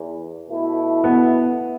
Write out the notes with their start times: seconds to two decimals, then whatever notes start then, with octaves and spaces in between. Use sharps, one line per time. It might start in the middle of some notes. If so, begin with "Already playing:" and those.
Already playing: E2
0.48 B2 A3 E4
1.04 B3